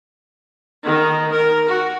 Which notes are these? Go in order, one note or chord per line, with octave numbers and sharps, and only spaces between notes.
D#3
A#4
F#4